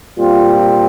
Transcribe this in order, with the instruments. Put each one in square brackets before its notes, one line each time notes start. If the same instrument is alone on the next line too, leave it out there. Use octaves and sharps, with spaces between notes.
[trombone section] A#2 G3 C4 F4